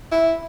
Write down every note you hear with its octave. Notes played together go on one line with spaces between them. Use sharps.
E4